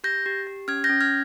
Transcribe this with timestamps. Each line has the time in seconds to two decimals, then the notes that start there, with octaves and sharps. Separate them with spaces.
0.04 G4 G6 A#6
0.26 G4
0.47 G4
0.68 C#4 F6 G#6
0.84 G6 A#6
0.90 C#4
1.01 F6 G#6